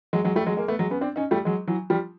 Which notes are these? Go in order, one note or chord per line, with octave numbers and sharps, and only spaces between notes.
F#3 G#3
F#3 G#3
G3 A3
F#3 G#3
G#3 A#3
A3 B3
F#3 G#3
B3 C#4
C4 D4
C#4 D#4
G3 A3
F#3 G#3
E3 F#3
F3 G3